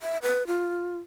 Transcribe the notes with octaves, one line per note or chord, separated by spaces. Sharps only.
E5
B4
F4